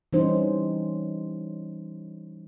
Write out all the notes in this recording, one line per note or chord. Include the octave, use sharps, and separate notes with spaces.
E3 G3 C#4 D#4 C5